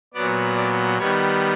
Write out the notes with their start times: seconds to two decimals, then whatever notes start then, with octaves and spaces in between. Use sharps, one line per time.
0.14 A#2 F#3 B3 D5
0.56 D5
0.98 D#3 G3 B3 C#5